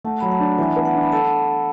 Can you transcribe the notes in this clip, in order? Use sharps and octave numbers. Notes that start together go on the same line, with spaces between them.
A3 F#5 A5
F#3 B5
F#5 A5
D4
E3 E5 G#5
B3
F#5 A5
D4
B5
A4 F#5 A5